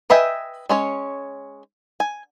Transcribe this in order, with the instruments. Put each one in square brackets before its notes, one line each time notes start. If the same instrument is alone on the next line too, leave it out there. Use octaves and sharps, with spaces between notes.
[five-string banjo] B4 D#5 E5 G5 G#5
G#3 C#4 C#5
G#5